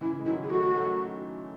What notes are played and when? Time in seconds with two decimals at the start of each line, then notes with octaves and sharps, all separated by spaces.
0.01 C#3 E3 E4
0.19 G#3
0.26 D#3 F#3 E4
0.43 G#4
0.50 F#3 A3 F#4
0.75 F#3 A3